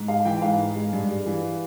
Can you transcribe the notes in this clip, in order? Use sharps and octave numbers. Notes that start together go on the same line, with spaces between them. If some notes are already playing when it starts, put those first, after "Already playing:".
Already playing: G#2
G#3 F5
E3 G5
G#2 F5
G#2
G#3
G2
G3
E3